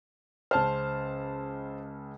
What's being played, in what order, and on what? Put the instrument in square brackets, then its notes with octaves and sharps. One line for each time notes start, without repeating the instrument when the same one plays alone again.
[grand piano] C#2 A5 F6 [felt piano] C5